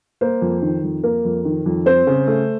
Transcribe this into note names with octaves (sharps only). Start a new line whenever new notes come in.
A#3 C5
F2
D#3
F2
A#3 A#4
F2
D#3
F2
C4 C5
C#3
A3